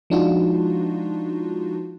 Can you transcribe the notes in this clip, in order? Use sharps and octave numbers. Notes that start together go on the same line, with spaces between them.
F3 G#3 D4 D#4 F4 F#4